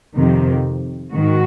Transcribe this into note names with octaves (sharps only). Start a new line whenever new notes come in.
F2 C3 D#3
G#2 D#3 F#4